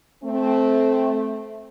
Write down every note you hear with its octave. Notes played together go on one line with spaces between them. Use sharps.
A3 C4